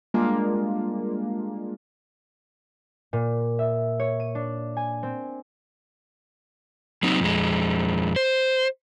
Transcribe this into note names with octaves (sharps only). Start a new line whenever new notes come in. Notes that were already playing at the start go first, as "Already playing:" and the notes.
G3 G#3 A#3 D4 F4
A#2
E5
C#5
D#7
D4
G#5
C4
F#3 C4 D#4
F2 G#3
C5